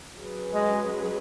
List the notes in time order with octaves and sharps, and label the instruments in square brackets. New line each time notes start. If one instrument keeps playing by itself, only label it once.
[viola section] F#3 C#4 G#4 B4
[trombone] G#3